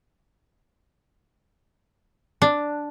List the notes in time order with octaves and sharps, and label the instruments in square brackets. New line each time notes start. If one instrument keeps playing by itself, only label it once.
[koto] D4